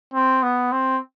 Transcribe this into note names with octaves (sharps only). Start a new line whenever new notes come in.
C4
B3
C4